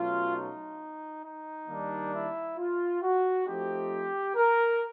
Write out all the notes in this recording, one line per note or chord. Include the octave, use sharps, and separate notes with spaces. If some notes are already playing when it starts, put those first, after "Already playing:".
Already playing: B2 F#3 A3 C#4 F4
D#4
D#4
D#3 G3 A#3 D4
E4
F4
F#4
F3 A3 C4 D#4 G4
A#4